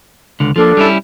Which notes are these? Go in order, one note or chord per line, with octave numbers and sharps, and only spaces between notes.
C#2 D3
F3 A#3 D4 A4
G3 C#4 E4